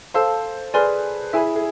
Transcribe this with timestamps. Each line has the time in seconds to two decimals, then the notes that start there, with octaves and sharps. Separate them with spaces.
0.14 A4 C5 F5 A5 E6
0.74 G#4 B4 D5 G#5 C6 F6
1.33 E4 G#4 E5 G#5 B5
1.55 G#4